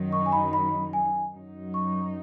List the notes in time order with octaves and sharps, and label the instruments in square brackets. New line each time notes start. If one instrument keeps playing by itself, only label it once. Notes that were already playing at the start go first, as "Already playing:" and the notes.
Already playing: [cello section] F#2 D#3 F#3 D#4
[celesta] C#6
G#5
B5
B5
G#5
[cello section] F#2 F#3 D#4
[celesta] C#6